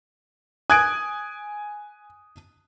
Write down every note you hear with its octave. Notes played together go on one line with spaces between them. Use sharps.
G#5 D#6 F#6 G#6 D7